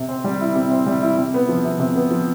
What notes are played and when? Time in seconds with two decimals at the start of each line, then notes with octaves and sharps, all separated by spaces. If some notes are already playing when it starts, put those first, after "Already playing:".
Already playing: C3
0.09 C4
0.24 G3
0.41 E4
0.56 C3
0.71 C4
0.87 G3
1.02 E4
1.19 C3
1.34 B3
1.49 F3
1.65 C3
1.80 C3
1.96 B3
2.11 F3